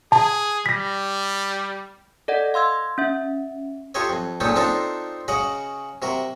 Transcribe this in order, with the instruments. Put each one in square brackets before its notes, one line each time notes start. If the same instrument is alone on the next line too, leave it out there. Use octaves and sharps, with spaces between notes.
[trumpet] G#4 [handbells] A5
[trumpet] G3 [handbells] A#6 B6
[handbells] A4 D5 D#5 F#5
F5 C6 E6 G#6
C#4 E5
[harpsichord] F4 G4 A4 C#5 D#5
F2
C#2 A#2 C#4 D#4 A4 G5
C4 D4 D#4 F4 A4 A#4
C#3 F#4 D#5 F#5
C3 F#4 A#4